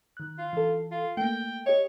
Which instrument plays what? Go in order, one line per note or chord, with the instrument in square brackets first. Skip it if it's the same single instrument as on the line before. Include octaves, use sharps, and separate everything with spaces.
[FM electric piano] D#3 F#6
[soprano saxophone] F4
[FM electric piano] E3 A4
[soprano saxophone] F4
[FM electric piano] A3 A#3 [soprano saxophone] G5
[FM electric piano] G4 D#5 [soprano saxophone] C#5